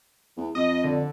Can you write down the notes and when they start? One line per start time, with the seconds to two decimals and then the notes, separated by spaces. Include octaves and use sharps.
0.37 E2
0.55 F2 D#5
0.84 D3